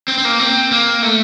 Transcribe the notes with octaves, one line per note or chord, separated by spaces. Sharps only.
C4
C4
A#3
C4
A#3
A3